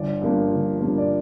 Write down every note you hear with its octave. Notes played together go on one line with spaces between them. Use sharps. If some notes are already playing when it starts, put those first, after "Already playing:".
Already playing: G1 D5
G2 F3 A#3
G1
G2 F3 A#3
D5